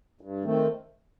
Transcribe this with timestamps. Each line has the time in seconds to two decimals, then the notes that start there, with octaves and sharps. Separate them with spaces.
0.21 G2
0.45 D#3 A3 C4